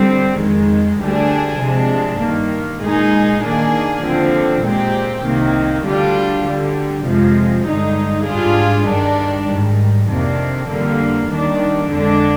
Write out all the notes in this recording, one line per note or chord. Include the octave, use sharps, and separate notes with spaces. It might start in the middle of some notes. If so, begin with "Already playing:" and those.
Already playing: D3 G3 C4
F2 D#3 G#3
D2 D3 G3 D4 G#4
C3 F3 G#3 D4
G2 D#3 A#3
A#2 G#3 D#4 G#4
D#3 A#3 D4 G#4
D#2 D3 F3 C4
A#2 G#3 C4 G4
C2 C3 D#3 A#3
D2 D3 G3 D4 F4
D2 D3 G3
F2 C3 F3 G#3
G2 D3 G#3 D#4
G#2 G3 D4 F4 G#4
G2 D#3 G3 D4
G#2 D#3 G3
F2 C3 D#3 A#3 D4
F2 D3 G3 A#3
D#2 D#3 G3 D4
F2 D3 G#3 D4